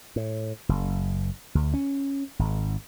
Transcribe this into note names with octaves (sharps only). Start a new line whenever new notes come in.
A2
F#1
D2
C#4
G#1